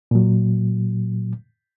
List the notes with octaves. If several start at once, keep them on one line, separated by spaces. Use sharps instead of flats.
A#2 F#3